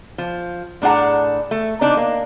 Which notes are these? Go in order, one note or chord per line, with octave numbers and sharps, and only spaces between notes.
F3
A2 D4 G#4 F#5 A#5
A3
C3 D4 D#4 D5
A#3